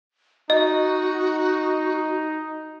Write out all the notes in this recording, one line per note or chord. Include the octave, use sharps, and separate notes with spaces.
D#4 F#4 D#5